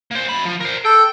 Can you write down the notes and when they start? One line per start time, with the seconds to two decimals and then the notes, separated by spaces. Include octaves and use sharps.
0.11 A#3 C5
0.29 F#2 B5
0.45 F3
0.61 A#4 C5
0.85 A4 G5